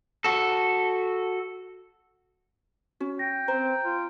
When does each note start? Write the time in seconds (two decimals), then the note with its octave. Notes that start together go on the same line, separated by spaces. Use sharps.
0.24 F#4 A4
3.00 C#4 F#4
3.19 G5 A#6
3.48 C4 C5 A#5
3.85 F4